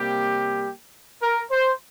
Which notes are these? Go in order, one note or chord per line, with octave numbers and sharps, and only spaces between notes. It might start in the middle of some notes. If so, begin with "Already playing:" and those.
Already playing: C3 G3 A#3 G4
A#4
C5